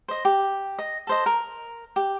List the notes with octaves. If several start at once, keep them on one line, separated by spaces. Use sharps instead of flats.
C5 D#5
G4
D#5
A4 C5 D#5
A#4
G4